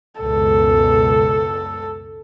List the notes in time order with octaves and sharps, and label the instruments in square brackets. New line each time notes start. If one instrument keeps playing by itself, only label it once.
[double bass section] C#2 F#2 B2 [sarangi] A4